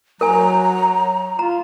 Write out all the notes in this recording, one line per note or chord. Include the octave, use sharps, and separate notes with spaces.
F#3 A#4 G#5 A#5
F4 A#5